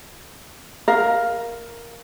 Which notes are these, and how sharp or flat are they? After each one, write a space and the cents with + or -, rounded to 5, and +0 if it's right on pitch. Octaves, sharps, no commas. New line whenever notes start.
A#4 +5 F5 +0